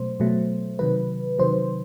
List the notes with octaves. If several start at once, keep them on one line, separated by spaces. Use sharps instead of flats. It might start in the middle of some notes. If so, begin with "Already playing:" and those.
Already playing: B2 F#3 A3 C5
B2 F#3 A3
C3 D#3 F#3 B4
C3 D#3 F#3 C5